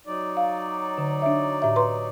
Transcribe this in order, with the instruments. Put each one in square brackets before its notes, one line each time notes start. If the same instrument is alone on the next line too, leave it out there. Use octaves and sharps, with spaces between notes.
[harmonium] F#3 D#4 D5
[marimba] F5
D3
D4 E5
A2 E5
B4 A#5 C6